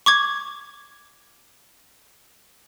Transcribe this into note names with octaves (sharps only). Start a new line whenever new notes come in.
C#6 D6 G#6